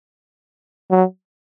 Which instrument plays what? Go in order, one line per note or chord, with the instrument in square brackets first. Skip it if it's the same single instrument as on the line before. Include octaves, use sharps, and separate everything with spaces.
[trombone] F#3